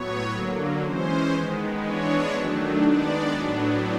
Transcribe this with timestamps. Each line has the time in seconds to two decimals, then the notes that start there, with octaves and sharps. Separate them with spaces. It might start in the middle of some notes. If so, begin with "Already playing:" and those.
Already playing: A2 F#3 B3 C#5
0.32 D3 F#3 A#3
0.82 E3 G#3 C#4 C5
1.33 D#3 G#3 B3
1.82 E3 G#3 B3 D4 C#5
2.33 D#3 F#3 A3 D4
2.83 D#3 G#3 B3 D4 D5
3.33 A2 F#3 B3 D4